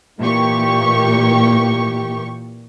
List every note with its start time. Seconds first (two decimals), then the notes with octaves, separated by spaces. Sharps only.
0.20 A#2 E3 A#3 G4 C#6